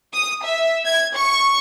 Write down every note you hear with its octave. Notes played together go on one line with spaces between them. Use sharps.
D#6
E5
G#6
C#6